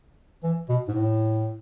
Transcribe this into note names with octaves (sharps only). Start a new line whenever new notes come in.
E3
B2
G#2
A2